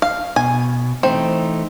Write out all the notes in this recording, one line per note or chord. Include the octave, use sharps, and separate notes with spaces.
F5
B2 G#5
E3 A3 C4 D#4